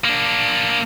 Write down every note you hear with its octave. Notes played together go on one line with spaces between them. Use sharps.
A#3 D4